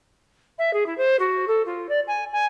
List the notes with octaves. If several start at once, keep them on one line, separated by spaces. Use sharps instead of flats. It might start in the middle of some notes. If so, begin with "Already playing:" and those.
E5
G#4
E4
C5
F#4
A4
F4
D5
G#5
G#5